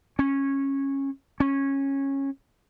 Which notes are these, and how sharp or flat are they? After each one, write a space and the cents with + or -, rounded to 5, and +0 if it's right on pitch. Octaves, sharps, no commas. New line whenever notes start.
C#4 -15
C#4 -15